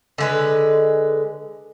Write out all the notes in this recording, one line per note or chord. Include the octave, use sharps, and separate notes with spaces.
D3 G#3 B4